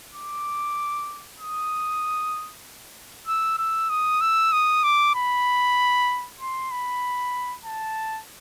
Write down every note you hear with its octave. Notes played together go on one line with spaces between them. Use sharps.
D6
D#6
E6
E6
D#6
E6
D#6
D6
B5
C6
B5
A5